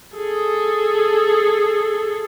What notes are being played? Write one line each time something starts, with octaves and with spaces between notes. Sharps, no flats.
G#4 A4